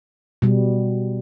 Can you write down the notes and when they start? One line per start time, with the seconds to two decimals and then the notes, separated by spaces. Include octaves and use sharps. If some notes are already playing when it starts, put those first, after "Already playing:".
0.42 B2 G3